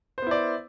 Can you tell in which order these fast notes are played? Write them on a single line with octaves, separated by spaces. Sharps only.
C5 B3 E4 D5